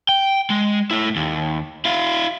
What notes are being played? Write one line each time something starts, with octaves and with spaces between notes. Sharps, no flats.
G5
G#3
A3 E4
D#2
E4 F5